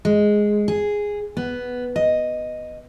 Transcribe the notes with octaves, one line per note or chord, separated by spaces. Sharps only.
G#3
G#4
B3
D#5